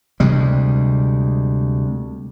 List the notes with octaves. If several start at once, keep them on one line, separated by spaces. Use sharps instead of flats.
D2 C3 G3 G#3